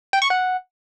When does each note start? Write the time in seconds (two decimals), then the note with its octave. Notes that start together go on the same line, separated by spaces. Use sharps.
0.13 G5
0.22 C#6
0.30 F#5